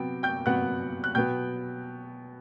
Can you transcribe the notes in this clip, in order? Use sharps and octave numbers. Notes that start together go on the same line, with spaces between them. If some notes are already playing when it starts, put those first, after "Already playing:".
Already playing: C3 F#3 B3 G5
G5 G6
C3 F#3 B3 F#5 F#6
F#6
B2 F#3 B3 G5 G6